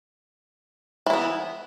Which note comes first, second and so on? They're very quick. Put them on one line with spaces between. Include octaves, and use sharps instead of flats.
E3 E4 B3